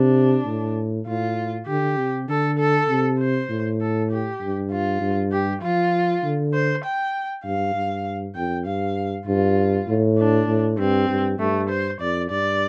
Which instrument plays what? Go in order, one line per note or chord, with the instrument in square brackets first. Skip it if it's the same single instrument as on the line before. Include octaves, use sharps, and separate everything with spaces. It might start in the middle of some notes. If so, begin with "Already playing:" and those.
Already playing: [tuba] C3 [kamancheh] D4
[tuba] A2
[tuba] A2 [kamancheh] F4
[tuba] D3 [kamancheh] G4
[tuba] C3
[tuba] D3 [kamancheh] A4
[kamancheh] A4
[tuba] C3
[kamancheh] C5
[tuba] A2
[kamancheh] A4
G4
[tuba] G2
[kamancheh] F4
[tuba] G2
[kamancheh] G4
[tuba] F3 [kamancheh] F4
[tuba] D3
[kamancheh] C5
G5
[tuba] G2 [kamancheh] F5
[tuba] G2
[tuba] F2 [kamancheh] G5
[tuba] G2 [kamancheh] F5
[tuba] G2 [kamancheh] F4
[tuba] A2
[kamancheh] D4
[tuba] A2
[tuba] G2 [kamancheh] C4
[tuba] G2
[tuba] G2 [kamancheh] A3
[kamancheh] C5
[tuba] F2 [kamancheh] D5
[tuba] G2 [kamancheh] D5